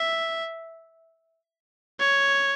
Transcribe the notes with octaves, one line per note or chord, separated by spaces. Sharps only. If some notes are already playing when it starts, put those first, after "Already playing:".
Already playing: E5
C#5